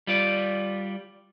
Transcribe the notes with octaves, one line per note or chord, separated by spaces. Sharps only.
G3 F4 D5